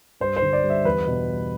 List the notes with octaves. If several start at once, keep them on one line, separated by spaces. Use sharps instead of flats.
G2 C5
C5
D3
D5
G3
E5
E2 B4
B2
G3